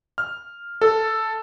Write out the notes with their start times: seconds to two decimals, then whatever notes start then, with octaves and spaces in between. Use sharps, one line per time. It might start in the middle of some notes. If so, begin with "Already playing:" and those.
0.18 F6
0.81 A4